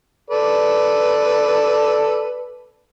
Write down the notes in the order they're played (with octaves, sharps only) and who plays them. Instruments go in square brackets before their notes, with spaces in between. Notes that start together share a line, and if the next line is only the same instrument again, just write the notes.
[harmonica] A4 B4 D5